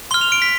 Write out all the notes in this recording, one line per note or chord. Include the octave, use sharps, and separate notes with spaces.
C6 F6 G7
F7
D7
B6